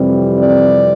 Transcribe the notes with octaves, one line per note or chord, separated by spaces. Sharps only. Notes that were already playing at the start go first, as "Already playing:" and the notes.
Already playing: F2 C3 E3 G3 C4
D5